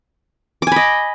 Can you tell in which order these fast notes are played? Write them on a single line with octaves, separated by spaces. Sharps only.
D6 G#5 B5 D#5